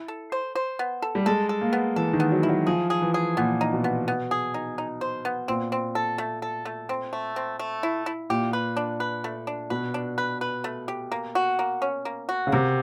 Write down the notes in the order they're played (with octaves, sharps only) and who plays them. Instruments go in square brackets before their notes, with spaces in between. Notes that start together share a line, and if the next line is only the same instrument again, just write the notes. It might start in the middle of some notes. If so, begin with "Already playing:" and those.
Already playing: [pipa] E4
A4
C5
C5
B3
A4
[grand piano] G3
[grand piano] G#3 [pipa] A4
[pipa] A4
[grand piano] A#3
[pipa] B3
[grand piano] E3 [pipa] A4
[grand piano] D#3
[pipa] B3
[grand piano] F#3
[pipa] E4
[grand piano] F#3
[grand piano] F3 [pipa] G#4
[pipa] G#4
[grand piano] E3
[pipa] G#4
[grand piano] A#2 [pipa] B3
[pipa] D#4
[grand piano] B2
[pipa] B3
B3
G#4
D#4
D#4
C5
B3
[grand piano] A#2 [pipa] C4
[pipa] C4
A4
A3
A4
A3
C4
A3
C4
A3
E4
E4
[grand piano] A#2 [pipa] G4
[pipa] B4
D4
B4
A3
D4
[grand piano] B2 [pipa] B4
[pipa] D4
B4
B4
A3
G4
A#3
F#4
A#3
C#4
A#3
F#4
[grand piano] C#3
[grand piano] C3 [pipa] A#3